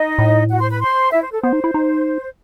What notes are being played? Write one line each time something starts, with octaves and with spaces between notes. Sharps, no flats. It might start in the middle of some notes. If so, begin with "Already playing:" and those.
Already playing: D#4 D#5
A2
F#4 F#5
C5 C6
B4 B5
C5 C6
E4 E5
C5
A4
B3 C5
D#4
E4
D#4